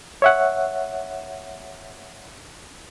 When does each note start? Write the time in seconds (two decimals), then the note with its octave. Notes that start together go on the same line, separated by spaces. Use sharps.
0.22 C#5 E5 F#5